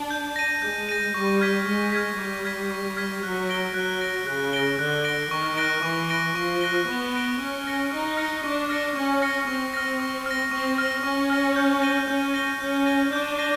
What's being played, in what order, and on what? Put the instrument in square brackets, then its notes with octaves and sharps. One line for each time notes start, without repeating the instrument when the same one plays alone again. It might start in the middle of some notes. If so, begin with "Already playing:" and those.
Already playing: [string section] D4
[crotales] G6
A#6 D#7
[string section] G#3 [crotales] G6
[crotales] A#6 D#7
[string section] G3 [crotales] C#6
[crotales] F6 G#6 B6
[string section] G#3 [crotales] C#6
[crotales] F6 G#6 B6
[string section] G3 [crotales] C#6
[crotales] F6 G#6 B6
C#6
F6 G#6 B6
[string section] F#3 [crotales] F#6
[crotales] A#6 D7 G7
[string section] F#3 [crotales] F#6
[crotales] A#6 D7 G7
[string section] C#3 [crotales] F#6
[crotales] A#6 D7 G7
[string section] D3 [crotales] F#6
[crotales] A#6 D7 G7
[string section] D#3 [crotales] C#6
[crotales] F#6 A#6 D7 G7
[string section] E3 [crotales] C#6
[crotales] F#6 A#6 D7 G7
[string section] F3 [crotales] C#6
[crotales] F#6 A#6 D7 G7
[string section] B3 [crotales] C#6
[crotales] F#6 A#6 D7 G7
[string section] C#4 [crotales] C#6
[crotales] F6 A#6 C#7
[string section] D#4 [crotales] C#6
[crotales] F6 A#6 C#7
[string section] D4 [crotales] C#6
[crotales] F6 A#6 C#7
[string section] C#4 [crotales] C#6
[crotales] F6 A#6 C#7
[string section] C4 [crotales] C#6
[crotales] F6 A#6
C#6
F6 A#6
[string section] C4 [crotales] C#6
[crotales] F6 A#6
[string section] C#4 [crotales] C#6
[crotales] F6 A#6
G6
A#6 D#7 G7
[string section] C#4 [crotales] G6
[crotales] A#6 D#7 G7
[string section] C#4 [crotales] G6
[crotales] A#6 D#7 G7
[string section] D4 [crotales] G6
[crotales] A#6 D#7 G7